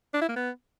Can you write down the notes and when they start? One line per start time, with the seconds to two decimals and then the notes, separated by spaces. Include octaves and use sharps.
0.14 D4
0.22 E4
0.29 A#3
0.36 B3